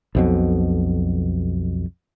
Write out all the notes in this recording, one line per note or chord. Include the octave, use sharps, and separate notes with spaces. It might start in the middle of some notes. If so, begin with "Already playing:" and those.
B1 F2 B2